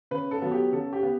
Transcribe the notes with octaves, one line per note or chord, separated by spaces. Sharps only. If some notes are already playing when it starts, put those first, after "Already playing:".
C#3 B4
A4
F#3 B3
G4
C#3 A4
G4
B3